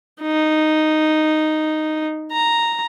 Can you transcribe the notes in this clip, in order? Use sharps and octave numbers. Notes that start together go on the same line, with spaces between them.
D#4
A#5